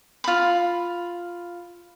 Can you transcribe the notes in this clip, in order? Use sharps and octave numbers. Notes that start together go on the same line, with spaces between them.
F4 B5